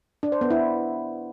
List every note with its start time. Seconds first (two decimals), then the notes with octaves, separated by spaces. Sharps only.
0.23 D4
0.32 C5
0.41 B3
0.50 E4